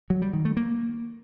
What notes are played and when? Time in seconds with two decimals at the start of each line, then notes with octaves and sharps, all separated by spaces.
0.10 F#3
0.22 G3
0.33 D#3
0.45 A3
0.57 A#3